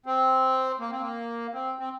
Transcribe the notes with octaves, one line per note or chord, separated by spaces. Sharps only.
C4
A#3
C4
A#3
C4
C4